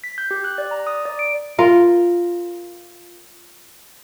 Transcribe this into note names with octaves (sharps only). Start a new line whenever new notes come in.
B6
G6
G4
F#6
D5
A#5
D#6
D5
D7
F4 A#4